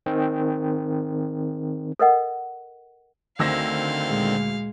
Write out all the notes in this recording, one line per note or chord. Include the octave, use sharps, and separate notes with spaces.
D#3 C4
A4 A#4 D#5 F#5
D2 D3 D#3 C4 F5 E6 A#6
A#2 G#3